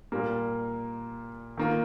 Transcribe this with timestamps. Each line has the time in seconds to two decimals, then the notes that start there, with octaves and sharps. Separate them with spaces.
0.12 A#2 G3 A#3
1.57 D#3 A#3 F4